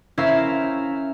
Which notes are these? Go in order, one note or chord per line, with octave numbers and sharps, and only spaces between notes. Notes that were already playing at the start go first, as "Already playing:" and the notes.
C#4 E4 A#4 C5 E5 F5